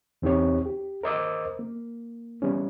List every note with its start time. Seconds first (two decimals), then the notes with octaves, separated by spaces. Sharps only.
0.22 E2 C4 D#4 G4 C#5
0.66 G4
1.03 A#4 C5 D#5 D6 E6
1.59 A#3
2.42 G3 B3 C#4